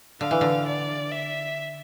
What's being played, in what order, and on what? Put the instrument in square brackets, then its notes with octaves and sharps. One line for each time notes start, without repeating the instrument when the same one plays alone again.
[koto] D3 [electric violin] F5
[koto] E3
D3
[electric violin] D5
E5